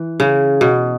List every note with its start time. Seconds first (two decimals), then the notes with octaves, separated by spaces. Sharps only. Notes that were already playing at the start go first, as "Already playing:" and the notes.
Already playing: E3
0.20 C#3
0.61 B2